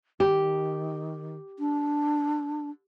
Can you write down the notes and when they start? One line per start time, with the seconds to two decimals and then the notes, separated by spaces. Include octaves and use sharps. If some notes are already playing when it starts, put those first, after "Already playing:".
0.20 D#3 G4
1.59 D4